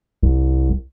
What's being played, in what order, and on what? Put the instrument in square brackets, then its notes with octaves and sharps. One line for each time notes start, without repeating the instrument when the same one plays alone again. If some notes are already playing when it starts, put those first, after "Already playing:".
[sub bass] C2